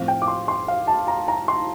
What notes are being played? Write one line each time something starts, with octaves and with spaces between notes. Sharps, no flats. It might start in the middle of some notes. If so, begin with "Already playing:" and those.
Already playing: A2 F3 C4 F5
G5
D6
C6
C6
F5
A5
A#5
A#5
C6